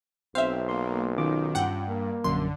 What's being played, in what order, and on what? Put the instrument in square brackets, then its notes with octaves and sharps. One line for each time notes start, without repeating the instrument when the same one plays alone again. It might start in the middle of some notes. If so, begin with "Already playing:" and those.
[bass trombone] B1 [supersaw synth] C4 [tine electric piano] C5 [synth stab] E5 F5
[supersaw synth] A#3 [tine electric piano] C6
[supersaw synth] D#3 [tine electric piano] C#4 F4 D6
[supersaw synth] G2 [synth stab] F#5 G5
[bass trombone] A#3
[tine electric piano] A#1 F#2 [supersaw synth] D3 [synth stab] C6